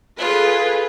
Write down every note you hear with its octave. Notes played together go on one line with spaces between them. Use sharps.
F4 G#4 A4 B4